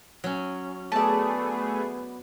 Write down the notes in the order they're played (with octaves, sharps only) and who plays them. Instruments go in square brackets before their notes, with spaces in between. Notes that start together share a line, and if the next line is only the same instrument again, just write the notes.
[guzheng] F#3 C#4
[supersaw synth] A3 G#4 [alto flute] B3 [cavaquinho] D5 A5